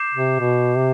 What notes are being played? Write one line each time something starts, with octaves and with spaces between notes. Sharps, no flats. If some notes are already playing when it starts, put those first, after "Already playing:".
Already playing: D6 G6 C7 E7
C3
B2
C3